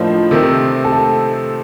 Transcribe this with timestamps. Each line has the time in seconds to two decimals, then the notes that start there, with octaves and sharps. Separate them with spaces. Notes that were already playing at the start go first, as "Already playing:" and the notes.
Already playing: A2 F3 A#3 D4 F4 C5 D#5
0.31 C3 D#3 A3 C4
0.85 A4